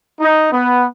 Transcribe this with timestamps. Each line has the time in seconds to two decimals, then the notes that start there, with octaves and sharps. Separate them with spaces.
0.21 D#4
0.53 B3